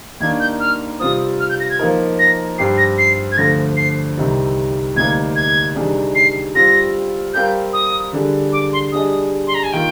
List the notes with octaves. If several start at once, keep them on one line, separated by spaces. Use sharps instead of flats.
D#2 D#3 A#3 D4 G#6
G6
F6
C3 G3 C4 F4 C5 D#6
F6
G6
A#6
G#6
F3 A#3 D#4 A#4
A#6
G2 F3 C4 G4 C7
A#6
C7
G#6
D2 D3 F3 A#6
C7
C2 C3 D#3 G3 C4
D2 C3 G3 A#3 D#4 G#6
G#6
C3 D#3 G3 D4 G#4
C7
G3 C4 F4 A#6
G3 C4 G4 A#4 F5 G6
D#6
D3 G3 D4 G#4
D6
C6
G3 D4 G#4 D#5 D#6
C6
A#5
G#5
D#3 A#3 F4 G5